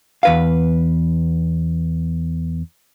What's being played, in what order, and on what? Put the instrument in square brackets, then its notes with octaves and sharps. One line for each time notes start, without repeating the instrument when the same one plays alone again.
[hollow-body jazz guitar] E2 B4 F5